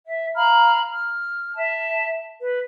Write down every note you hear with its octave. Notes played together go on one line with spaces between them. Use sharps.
E5
F5 A#5 B5 F6
F6
E5 A5
B4